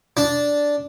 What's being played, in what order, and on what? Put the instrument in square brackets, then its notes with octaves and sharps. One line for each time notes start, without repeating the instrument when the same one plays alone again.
[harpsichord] D4